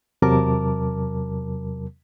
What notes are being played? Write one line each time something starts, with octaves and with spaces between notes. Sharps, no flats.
E2 C3 F#3 A#4 A5 D6